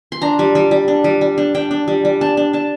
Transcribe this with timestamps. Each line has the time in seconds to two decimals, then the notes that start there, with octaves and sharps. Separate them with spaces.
0.12 C6
0.21 D4 A#5
0.39 G3
0.55 G3
0.71 G3
0.88 D4
1.04 G3
1.21 G3
1.38 D4
1.55 D4 G5
1.71 D4
1.88 G3
2.05 G3
2.21 D4 A5
2.37 D4
2.53 D4 A5